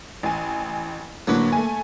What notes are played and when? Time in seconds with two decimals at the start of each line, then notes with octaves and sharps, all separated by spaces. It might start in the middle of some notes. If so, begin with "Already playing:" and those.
0.23 A1 G#5
1.27 A2 D3 F#3 A#3 B4
1.52 A3 G#5